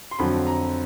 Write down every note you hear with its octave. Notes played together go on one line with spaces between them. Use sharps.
C6
F2 D3 F#3 B5
A#5